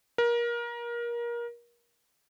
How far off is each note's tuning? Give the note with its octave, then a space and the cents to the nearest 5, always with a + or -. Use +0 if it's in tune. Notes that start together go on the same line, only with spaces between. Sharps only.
A#4 +25